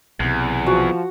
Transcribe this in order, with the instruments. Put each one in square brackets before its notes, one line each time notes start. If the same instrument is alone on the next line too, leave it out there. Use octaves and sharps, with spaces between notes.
[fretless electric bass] B1 C3 [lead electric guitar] E2
[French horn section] F3 [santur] F#4